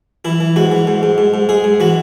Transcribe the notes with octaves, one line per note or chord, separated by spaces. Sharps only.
E3 E4
E3
G#2 F#4
E3
G#2
G#2
G#2
G#2
G#2 G#4
G#2
E3 F#4